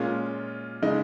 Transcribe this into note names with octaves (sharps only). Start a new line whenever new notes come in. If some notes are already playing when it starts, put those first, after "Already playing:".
Already playing: A#2 G#3 C#4 F4
C#3 G#3 D#4